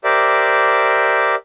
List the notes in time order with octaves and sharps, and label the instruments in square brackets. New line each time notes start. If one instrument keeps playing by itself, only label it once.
[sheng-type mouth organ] G4 A#4 C5 D5 E5